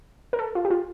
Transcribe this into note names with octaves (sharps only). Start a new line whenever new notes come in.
A#4
A4
F4
G4
F4